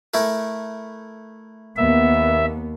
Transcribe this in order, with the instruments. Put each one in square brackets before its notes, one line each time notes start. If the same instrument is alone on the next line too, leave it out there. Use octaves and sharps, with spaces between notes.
[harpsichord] A3 E4 A#4
[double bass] D#2 A#3 [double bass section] B3 [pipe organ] E5